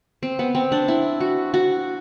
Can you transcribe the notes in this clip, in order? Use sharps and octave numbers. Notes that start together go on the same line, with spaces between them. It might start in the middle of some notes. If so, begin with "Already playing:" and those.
C4
B3
C4
D4
E4
F#4
F#4